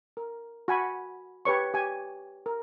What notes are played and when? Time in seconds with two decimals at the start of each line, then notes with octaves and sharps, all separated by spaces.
0.17 A#4
0.68 F#4 G#5 B5
1.45 G4 B4 C#5 C#6
1.74 G4 G#5
2.46 A#4